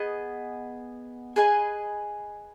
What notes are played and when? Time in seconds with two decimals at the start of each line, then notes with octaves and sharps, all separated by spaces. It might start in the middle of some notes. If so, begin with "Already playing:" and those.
Already playing: B3 G#4 D#5
1.36 G#4 B4 D#5 G#5